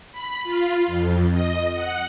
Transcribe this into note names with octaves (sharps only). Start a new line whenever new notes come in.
B5
F4
F2
D#5
F#5